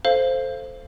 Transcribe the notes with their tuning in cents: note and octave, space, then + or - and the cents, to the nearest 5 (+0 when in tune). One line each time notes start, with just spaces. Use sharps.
A4 +0 C5 +0 F5 -15